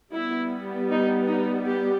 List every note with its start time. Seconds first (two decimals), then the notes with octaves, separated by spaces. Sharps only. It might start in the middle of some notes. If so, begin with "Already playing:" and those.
0.13 G3 B3 E4
0.90 D#4
1.28 D#4
1.66 G4